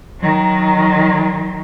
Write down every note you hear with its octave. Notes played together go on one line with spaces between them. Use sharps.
D#3 F#3